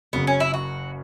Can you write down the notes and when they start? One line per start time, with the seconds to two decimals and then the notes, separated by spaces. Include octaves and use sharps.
0.13 F#1 F#2 C#3 B3
0.27 C#4
0.40 E4
0.54 F#4